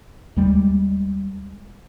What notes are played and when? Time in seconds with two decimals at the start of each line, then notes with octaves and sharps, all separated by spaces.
0.36 D#2 G3 G#3